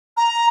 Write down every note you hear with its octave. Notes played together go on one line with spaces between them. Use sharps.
A#5